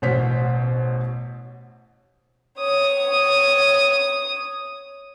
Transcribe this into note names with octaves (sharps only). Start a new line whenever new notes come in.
A1 B2 C5 C#5 B6
C#5 D#6